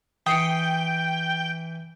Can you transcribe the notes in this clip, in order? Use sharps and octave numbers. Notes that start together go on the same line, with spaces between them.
E3 G5 D#6 C7 C#7